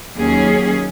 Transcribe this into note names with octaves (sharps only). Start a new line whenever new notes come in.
D#2 F#3 C#4 G#4